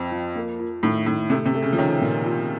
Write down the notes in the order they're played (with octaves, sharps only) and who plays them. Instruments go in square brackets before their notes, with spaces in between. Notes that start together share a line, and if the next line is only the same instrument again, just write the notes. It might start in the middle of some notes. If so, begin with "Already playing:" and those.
Already playing: [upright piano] F2 [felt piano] C4
[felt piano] F3
A#3
F4
[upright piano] A2 [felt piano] D#3
[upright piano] A2 [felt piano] D#3
[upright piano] C3 [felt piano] A3
[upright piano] C3
[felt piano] A3
[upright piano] C#3
F3
[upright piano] D#3 [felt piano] C#4
[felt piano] A#2
F4